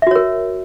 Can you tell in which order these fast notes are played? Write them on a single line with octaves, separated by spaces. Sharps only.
E5 F#4 C#5 A#4